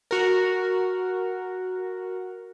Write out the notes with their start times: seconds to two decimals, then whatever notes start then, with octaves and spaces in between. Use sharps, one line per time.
0.11 F#4 A#4